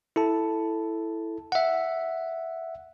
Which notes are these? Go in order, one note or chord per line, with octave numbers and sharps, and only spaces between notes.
E4 A4 A5
E5 F#5